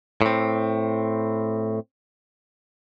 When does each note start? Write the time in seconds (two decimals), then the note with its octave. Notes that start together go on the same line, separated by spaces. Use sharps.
0.22 A2 C4